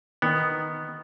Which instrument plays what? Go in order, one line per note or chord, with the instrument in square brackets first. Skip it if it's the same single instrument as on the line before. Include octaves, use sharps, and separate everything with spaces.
[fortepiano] D#3 [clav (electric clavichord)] B3